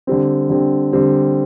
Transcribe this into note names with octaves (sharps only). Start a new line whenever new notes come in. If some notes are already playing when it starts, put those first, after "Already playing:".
D3 G3 C4
D3 G3 C4
D3 G3 C4